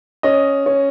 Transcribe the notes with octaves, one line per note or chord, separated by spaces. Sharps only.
C#4 D#5
C#4